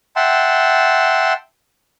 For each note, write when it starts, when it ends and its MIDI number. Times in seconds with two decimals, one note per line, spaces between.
0.16 1.33 76
0.16 1.33 78
0.16 1.33 79
0.16 1.33 81
0.16 1.33 84